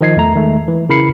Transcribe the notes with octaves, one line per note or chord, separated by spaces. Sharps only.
D#3 F3 D#5 G#6 C7
E2 A3 A#5
D#3 G#3 A3
E3
C#3 E4 A#4 B5 C7 C#7